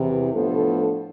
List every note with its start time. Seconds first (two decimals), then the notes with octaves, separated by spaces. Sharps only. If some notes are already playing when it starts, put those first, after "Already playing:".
Already playing: E2 C3 E3
0.34 A2 F3 B3 D4 A4